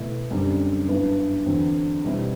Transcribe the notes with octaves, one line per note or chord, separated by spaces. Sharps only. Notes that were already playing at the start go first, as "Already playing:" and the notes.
Already playing: B2 A3 E4
F#2 D3 G3 C4
G2 F#3 B3 E4
E2 D3 F#3 C4
B2 G3 C4 E4